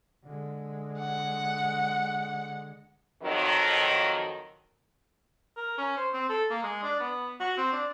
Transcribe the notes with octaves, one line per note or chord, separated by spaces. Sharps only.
D3 G#3
F#5
F2 D#3 F#3
A#4
C#4
C5
C4
A4
A#3
G#3
D4
B3
F#4
C4
D4